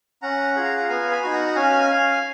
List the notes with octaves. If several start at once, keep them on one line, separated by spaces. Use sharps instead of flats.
C#4 F#5 A#5
F4 G#4
F5
F#5
B3 F5 G#5
G#5 B5
D#4 F#4
F#5 A#5
C#4 F5 G#5